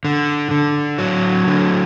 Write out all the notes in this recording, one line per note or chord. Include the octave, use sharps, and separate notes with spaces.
D3
D3
F#3
D3